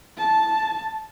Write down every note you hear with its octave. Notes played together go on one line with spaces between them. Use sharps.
A5